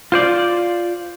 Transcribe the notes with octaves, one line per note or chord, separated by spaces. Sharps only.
F4 C5 D5